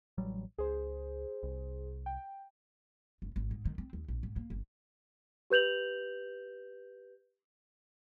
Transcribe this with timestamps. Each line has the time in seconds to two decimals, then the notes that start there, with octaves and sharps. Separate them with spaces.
0.18 A1 F#3 G3
0.58 C#2 G#4 C5
1.43 C2
2.06 G5
3.22 F#1
3.36 G#1
3.51 G#2
3.65 D#3
3.78 C4
3.93 D#2
4.08 A#1
4.23 G#2
4.36 A#3
4.50 G1
5.50 G4 B4 G6 F7 F#7